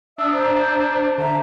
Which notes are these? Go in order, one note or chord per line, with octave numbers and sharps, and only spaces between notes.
D4 E5 D#6 E6
C5 A#5
D3 E5 A5 A#5